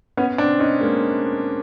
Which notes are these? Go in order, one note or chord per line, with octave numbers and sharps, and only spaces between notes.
B3 C#4
C4 D4
C#4 D#4
G#3 A#3